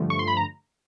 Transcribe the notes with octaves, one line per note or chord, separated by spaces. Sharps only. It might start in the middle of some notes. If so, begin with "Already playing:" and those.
Already playing: G2 D3 F3 A3
C#6
C6
B5
A#5